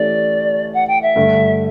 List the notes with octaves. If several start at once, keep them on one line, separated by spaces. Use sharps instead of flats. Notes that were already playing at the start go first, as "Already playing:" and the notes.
Already playing: E3 A3 C#4 G4 D5
F#5
G5
E5
G2 D3 A3